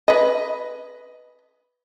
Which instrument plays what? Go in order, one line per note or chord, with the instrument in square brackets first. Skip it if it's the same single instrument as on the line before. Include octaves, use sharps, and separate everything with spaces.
[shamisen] B4 D#5